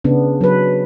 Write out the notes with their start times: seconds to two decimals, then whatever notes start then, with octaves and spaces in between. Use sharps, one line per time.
0.04 C#3 B3 D4
0.41 F#3 B4